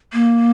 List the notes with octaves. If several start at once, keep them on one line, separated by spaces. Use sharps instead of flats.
A#3